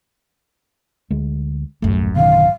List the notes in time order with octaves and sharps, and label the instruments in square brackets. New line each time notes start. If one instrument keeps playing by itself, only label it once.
[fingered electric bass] D2 G#3
[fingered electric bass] D#1 A3 [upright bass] A1 F#2
[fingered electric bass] B2 D3 D#3 [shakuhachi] F5